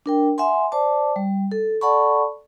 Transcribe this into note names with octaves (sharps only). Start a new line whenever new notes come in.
D4 A#4 G5
E5 F#5 G#5 C6
C5 D5 A5 D6
G3
A4
A4 D5 F#5 A5 B5 C#6